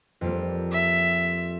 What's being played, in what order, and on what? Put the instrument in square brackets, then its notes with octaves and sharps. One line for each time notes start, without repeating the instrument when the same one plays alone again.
[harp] F2 G3 A#3
[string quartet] E5